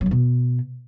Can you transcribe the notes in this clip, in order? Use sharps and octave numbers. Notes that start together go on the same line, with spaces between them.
F#3
E2
B2